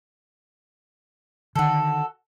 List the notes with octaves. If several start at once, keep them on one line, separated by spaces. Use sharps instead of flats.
D3 D#3 F#4 A4